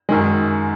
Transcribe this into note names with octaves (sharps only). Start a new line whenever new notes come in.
F#2 D#3 G#3